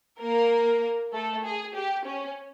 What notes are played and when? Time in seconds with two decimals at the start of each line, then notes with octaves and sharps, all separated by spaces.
0.22 A#3 A#4
1.14 A3 A4
1.44 G#4
1.75 G4
2.06 C#4